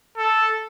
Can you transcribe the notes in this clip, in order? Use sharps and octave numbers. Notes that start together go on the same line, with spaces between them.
A4